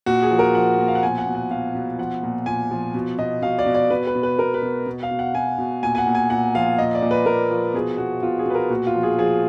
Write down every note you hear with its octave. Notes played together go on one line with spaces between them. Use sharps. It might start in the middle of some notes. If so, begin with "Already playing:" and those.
A#2 F#4
G#4
F3
A#4
F3 F#5
A#2
F5
F#5
B2 G#5
F#5
B2
F#5
B2 F5
B2
F3 F#5
A#2
A#2 G#5
F3
B2
B2 D#5
B2 F5
D5
B2
D5
B2 B4
B4
B2
B4
B2 A#4
B4
B2
B2
F5
B2
F#5
B2 G#5
B2
A#2 G#5
G#5
F#5
A#2
G#5
A#2 F#5
F3 F5
A#2 D#5
D5
A#2
B4
A#2 A#4
F3
B2 G#4
B2 F#4
B2 F4
G#4
B2 B4
A#4
A#2 F#4
F4
F3
G#4
F3 G#4